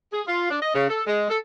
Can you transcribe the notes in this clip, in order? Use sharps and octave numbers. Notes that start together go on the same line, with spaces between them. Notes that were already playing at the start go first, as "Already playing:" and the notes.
G#4
F4
D4
D#5
C#3
A4
G#3
A4